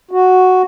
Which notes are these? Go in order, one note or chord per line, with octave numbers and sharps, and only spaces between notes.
F#4